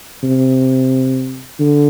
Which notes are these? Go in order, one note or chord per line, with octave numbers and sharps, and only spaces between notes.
C3
D3